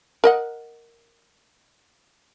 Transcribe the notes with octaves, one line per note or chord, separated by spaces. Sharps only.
A#4 D#5 F#5